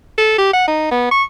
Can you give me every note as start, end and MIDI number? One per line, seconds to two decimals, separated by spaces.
0.18 0.35 69
0.39 0.49 67
0.53 0.67 78
0.68 0.87 63
0.91 1.11 59
1.11 1.23 85